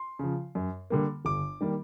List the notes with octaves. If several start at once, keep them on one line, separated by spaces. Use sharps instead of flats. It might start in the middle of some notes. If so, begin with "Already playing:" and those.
Already playing: C6
C#3 F3
F#2
D3 G3 A#3
G1 D6
D#3 G3 A#3